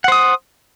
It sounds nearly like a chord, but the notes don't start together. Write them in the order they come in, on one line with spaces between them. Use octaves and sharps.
F#5 C5 D#6